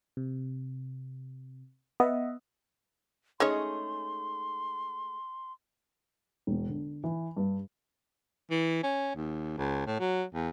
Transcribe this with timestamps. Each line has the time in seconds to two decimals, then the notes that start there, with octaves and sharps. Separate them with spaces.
0.17 C3
2.00 B3 D#5 E5 F#5
3.40 G#3 A3 C#4 D#4 G#4 C#5 C6
6.47 E1
6.69 D3
7.04 E3
7.37 G2
8.50 E3
8.83 C#4
9.15 D#2
9.57 C#2
9.87 A2
10.00 F#3
10.34 E2